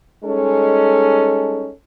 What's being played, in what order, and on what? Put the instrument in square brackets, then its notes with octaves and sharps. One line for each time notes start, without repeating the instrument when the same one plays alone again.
[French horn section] G3 G#3 C#4 D#4 A4